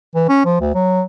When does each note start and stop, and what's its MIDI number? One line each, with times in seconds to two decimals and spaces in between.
0.15 0.25 52
0.29 0.45 61
0.45 0.59 53
0.61 0.71 38
0.74 1.02 54